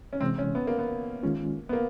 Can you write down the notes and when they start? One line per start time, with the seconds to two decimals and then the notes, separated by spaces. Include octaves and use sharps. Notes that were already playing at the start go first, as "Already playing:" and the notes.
0.13 C#4
0.21 C3 E3 G#3 C4
0.38 C#4
0.55 B3
0.67 A#3
0.79 B3
1.23 D#3 G#3 C#4 F4
1.69 B3
1.73 A#3